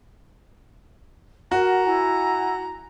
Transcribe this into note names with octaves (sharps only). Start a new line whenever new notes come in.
F#4 A#4 F#5 A#5
E4 F#5 G#5